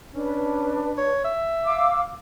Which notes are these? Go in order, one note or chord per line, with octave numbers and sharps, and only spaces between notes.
C#4 D4 B4
C#5
E5
F5 D6 E6